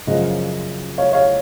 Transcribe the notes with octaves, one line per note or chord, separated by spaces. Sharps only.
F#2 C#3 F3 D#5 F#5
C#5 F5
C#5 F5